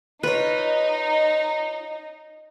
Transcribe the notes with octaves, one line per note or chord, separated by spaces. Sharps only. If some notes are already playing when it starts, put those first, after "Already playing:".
D#4 F4 B4 C#5